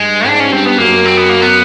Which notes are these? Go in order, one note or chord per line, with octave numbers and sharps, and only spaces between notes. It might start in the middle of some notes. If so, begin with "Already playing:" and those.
Already playing: G2 G#3
G#2 D4
C#4
G2 C4
B3
F#2 A#3
C4
B3
A#3
B3